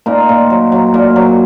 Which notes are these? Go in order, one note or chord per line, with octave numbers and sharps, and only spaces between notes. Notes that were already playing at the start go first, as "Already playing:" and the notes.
A#2 D#4
A#2
F#3
F#3
A#2
F#3